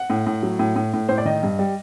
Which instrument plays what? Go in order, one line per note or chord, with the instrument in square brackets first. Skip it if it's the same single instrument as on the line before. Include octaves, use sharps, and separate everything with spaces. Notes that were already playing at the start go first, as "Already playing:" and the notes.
Already playing: [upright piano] F#5
A2
A2
F#3
A2
A2
A2
A2 C5
D5
D#3 D#5
G2
G3